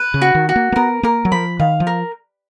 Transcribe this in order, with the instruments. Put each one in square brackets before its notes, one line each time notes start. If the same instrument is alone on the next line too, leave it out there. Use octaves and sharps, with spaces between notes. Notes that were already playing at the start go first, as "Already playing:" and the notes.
Already playing: [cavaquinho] B4
[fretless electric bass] C#3
[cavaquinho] F#4
[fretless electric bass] D#3
[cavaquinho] F#4
[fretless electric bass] A#3
A#3
[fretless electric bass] B3 [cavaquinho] A#4
[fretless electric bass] A#3 [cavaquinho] A#4
[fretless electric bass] F#3
[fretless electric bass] F3 [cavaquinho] B5
[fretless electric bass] D#3 [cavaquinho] F5
[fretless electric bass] F3
[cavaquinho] A#4